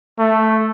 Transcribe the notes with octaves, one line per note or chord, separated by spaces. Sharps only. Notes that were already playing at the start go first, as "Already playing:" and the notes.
A3